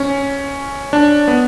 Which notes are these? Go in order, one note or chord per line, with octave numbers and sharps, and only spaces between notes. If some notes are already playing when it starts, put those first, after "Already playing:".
Already playing: C#4
D4
B3